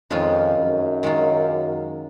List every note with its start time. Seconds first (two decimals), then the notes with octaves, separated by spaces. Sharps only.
0.10 F2 D#3 G#3 C#4 F4
0.57 F#2
1.03 D#3 G#3 C#4 F4